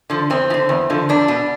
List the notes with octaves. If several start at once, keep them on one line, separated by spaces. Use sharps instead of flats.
D3 F3
E2 C4
F3
D3
E2
D3 F3
E2 D4
B2